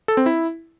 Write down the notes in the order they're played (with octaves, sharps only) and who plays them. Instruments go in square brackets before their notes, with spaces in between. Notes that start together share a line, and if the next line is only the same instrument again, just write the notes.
[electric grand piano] A4
C4
E4